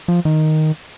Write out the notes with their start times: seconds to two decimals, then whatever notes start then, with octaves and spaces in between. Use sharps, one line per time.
0.08 F3
0.25 D#3